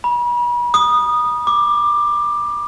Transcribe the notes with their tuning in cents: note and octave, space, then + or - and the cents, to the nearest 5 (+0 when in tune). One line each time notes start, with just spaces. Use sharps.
B5 -40
D#6 -15
D6 +15